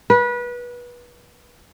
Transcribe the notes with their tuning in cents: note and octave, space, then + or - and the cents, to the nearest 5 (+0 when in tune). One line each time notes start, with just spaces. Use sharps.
B4 -25